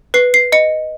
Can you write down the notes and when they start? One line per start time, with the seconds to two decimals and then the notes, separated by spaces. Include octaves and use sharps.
0.14 B4 C7
0.34 C7
0.52 D#5 C#7